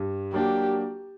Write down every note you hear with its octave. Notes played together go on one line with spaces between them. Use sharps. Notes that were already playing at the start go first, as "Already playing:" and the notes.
Already playing: G2
F#3 A#3 D4 G4